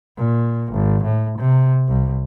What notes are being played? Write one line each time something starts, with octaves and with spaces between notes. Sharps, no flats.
A#2
G#1
A2
C3
C2